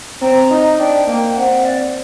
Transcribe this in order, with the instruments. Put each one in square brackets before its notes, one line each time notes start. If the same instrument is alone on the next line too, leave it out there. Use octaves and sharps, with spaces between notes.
[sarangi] C4 [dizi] A#5
[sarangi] D#4
[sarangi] D4 [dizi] G5
[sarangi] A#3 [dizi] G5
[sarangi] C4 [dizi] F#5
[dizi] D5